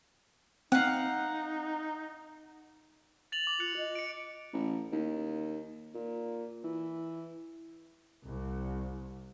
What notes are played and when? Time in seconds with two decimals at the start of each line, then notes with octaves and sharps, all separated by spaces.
0.72 C4 D#4 F5 F#5
3.32 A6 F7 F#7
3.47 D6
3.60 F4 F#6 C#7 F#7
3.77 D#5
3.95 C#7 D7
4.53 A1
4.92 D#2
5.94 A#2
6.64 E3
8.25 C2